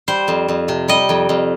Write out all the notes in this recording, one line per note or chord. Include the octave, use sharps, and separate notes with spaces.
G3 C5
F2
F2
C3
G3 D#5
F2
F2